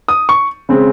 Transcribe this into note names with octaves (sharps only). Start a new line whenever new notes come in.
D#6
C#6
C#3 G#3 C4